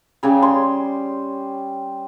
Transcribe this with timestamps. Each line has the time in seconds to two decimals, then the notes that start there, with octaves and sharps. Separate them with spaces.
0.23 C#3 G3
0.42 C6